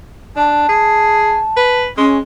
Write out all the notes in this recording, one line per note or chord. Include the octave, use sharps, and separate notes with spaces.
D4 A5
G#4
B4
G#3 C#4